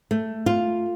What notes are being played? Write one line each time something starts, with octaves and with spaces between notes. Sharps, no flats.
A3
F4